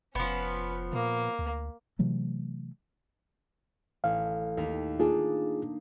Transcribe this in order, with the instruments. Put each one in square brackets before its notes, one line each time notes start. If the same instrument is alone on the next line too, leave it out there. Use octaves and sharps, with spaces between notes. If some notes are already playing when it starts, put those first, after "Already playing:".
[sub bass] F1 [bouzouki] F3 B3 [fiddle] C#4 B4
[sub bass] A#2 [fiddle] A#3
[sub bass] D2
[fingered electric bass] C3 E3 F#3 A3
[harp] A1 [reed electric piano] F5
[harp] D#2 A#4 B6
[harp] A#3 D4 D#4 [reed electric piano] F4 G#4